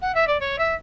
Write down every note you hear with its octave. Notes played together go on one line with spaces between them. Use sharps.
F#5
E5
D5
C#5
E5